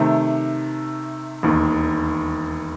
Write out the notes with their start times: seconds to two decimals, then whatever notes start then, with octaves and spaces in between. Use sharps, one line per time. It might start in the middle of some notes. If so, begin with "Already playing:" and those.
Already playing: C3 D#3 A3
1.43 E1 D#2 D#3